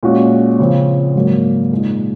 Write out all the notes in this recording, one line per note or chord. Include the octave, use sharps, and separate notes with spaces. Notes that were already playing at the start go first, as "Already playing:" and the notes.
A#2 G#3 C#4 F#4
C#3 F3 C4
G#2 F#3 A#3
A#2 G#3 D#4